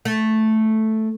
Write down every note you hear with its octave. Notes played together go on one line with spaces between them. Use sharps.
A3